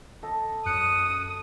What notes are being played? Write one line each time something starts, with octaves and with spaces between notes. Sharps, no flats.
A4 D#5 A5
F#2 D#6 F#6 C#7